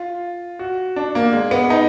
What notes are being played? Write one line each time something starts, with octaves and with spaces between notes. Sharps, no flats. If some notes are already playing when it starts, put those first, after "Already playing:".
Already playing: F4
F#4
D4
A#3
G#3
B3
D#4